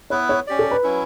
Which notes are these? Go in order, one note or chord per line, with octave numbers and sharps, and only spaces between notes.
B3 E4 B4 C#5
C#5
C#4 G4 D5
A4
B4
F#3 C#4 E4